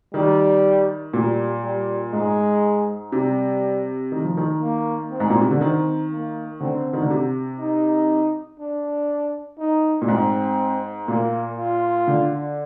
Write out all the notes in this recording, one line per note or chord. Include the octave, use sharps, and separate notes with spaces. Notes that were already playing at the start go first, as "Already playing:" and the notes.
D#3 G3
A#2 G3
G3
G#2 G#3
C3 G3
D#3
F3
D#3
A#3
C4
G#2
A#2
C3
D3
D#3 C4
A#3
D3 C4
D#3
D3
C3
D#4
D4
D#4
A#2
G#2 C4
A#2 A#3
F4
D3